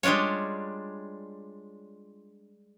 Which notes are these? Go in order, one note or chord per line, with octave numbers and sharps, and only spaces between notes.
G3 G#3 D4 F4 C#5